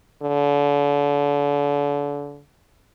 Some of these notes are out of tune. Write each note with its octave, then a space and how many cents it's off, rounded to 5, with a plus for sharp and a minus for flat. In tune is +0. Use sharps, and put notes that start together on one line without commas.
D3 -35